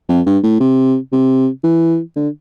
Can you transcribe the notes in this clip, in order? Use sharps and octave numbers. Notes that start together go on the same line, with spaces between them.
F2
G2
A2
C3
C3
E3
D3